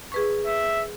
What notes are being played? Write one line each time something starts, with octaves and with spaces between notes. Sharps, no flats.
G#4 B4 C#6
E5